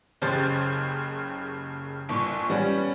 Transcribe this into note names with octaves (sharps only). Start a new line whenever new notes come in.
F#1 C#3 G4 C5 A6
G1 A#2 C#6
G3 B3 C#4 B4